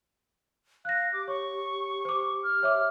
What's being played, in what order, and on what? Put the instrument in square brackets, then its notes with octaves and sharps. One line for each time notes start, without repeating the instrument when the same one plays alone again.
[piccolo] F5 [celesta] F#6 A#6
[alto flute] G4 [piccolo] D6
[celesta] C#5 [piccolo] C#6
[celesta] C5 D6
[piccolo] F6
[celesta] C#5 E5 D6